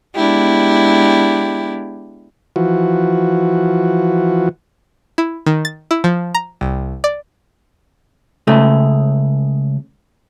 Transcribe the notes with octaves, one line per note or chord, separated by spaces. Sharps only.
G#3 B3 D4 E4 G4
E3 F3 F#4
E4
D#3
A6
E4
F3
A#5
C2
D5
C#2 C#3 A3